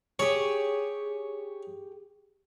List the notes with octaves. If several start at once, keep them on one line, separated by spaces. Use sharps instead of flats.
G4 G#4 C#5